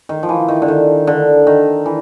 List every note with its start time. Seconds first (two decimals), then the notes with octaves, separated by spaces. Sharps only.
0.09 D#3
0.23 F3
0.29 E3
0.48 D#3
0.62 D3
0.68 D#3
1.07 D3
1.47 D#3
1.86 E3